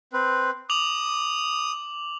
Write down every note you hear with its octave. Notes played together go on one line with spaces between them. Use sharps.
C4 B4
D6 D#6 F7 F#7